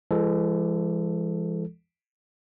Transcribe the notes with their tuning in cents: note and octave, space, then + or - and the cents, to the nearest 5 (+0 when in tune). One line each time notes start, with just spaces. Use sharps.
E3 +45 G#3 -20 A4 -5